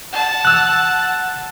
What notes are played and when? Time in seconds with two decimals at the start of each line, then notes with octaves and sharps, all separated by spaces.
0.13 F#5 A5
0.45 E6 F#6